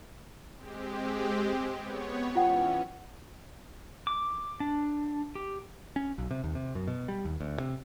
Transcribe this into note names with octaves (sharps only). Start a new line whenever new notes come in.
G#3 C4 G4
B3 C#5
E3 C#4 F4 F#5 G5
D6
D4
G4
C#4
B1
C3
D#2
C3
F#2
B2
G3
D#2
D2
C3